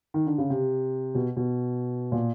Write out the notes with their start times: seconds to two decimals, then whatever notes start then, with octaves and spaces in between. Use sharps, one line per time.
0.14 D#3
0.27 D3
0.38 C#3
0.50 C3
1.15 B2
1.36 B2
2.12 A#2